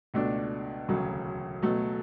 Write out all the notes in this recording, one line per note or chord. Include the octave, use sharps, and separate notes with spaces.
C#2 B2 A3 D4
E1 D2 C#3 F#3
B2 F#3 A3